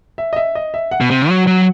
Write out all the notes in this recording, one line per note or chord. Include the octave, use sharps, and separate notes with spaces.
E5
D#5
E5
D#5
E5
F#5
B2
C3
F#3
F#3